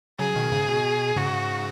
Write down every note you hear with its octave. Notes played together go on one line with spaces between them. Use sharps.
C#3 F#3 G#4
B2 D#3
G#2 C#3
B2
G#2 C#3 F#4